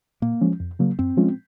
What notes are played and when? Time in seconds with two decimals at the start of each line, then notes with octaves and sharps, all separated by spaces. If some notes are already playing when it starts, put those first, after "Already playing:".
0.22 A#2 A#3
0.41 F3 G#3 C#4
0.60 F2
0.79 C#3 F#3 A#3
0.99 F#2 C4
1.17 F3 G#3 C#4 F4